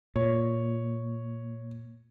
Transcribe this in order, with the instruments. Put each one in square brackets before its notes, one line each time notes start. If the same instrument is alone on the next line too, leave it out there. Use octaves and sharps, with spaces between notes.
[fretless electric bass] A#2 [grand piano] C#5